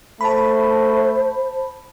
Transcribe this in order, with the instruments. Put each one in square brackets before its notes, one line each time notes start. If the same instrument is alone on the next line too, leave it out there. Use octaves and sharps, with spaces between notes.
[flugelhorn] A3 [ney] C5 [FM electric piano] A5 B5